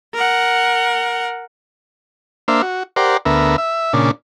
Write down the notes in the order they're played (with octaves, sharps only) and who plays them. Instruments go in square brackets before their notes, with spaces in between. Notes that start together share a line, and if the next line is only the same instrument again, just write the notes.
[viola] A#4 F#5
[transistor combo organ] A#3 D4 C5 E5 F5
F#4
G4 A#4 C5 D5 F#5
D2 B3 A#4 E5
E5
A#2 C#3 D4